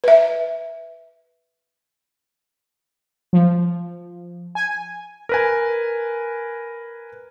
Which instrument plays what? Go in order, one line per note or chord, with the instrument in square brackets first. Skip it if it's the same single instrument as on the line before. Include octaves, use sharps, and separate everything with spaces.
[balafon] B4 E5
[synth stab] F3
G#5
[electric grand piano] A#4 B4 G#5